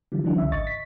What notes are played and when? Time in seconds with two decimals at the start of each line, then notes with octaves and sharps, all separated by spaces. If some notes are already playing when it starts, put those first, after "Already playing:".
0.12 D3 E3 F3 G3
0.23 D3 E3 F#3 A3 C#4 D4
0.38 C#2 D3 E5
0.51 G#1 D#5 C#6 A6
0.67 B6